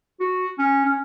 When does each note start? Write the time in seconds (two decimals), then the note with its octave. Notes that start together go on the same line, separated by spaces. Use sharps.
0.20 F#4
0.59 C#4
0.85 C#4